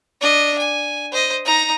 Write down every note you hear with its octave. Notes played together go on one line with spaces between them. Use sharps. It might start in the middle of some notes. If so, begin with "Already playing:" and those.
D4 D#5
G#5
C5 D#5
D#4 A#5